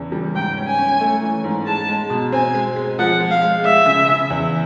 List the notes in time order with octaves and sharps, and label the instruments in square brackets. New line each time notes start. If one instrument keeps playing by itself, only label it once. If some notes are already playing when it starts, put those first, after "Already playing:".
Already playing: [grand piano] E2 C#3 E3
G3
[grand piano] G#2 [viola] G5
[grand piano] C#4
[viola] G#5
[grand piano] C#4
A3
E3
G#2
[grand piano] G#3 [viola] A5
[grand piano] G#3
B2
[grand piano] C4 [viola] G#5
[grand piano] G#3
G#3
[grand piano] F3 [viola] F#5
[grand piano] G#3
[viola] F5
[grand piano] G#3
[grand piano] G#3 [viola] E5
[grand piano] C#3
C#3
E2